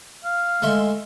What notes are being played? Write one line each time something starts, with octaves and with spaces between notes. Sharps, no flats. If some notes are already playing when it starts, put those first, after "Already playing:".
F5
G#3 A3 E5 C6